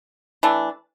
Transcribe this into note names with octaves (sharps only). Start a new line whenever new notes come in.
E3 A3 D4